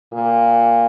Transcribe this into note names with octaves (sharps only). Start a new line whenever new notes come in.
A#2